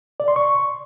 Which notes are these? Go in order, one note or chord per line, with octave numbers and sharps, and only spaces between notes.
D5
C6
C#6